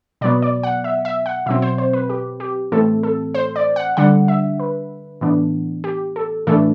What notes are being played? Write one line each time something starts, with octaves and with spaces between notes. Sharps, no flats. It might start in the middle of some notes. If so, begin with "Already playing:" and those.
B2 F#3 B3 D5
D5
F#5
E5
E5
F#5
B2 F#3 C4 E5
C5
C5
B4
G4
G4
A2 E3 A3 C4 A4
A4
C5
D5
F#5
D3 G3 D4 F#5
E5
B4
A2 E3 B3 D4
G4
A4
A2 E3 A3 D4 A4